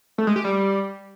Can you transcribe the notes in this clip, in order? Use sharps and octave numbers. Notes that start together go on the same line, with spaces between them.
A3
G#3
G4
G3